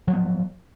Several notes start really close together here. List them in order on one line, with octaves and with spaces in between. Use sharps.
F3 F#3 B3